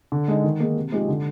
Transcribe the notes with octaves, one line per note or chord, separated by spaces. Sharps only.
D3
G#3 D#4
D#3
A#3 D#4 G#4
C3
F3 G#3 D#4 G4
D3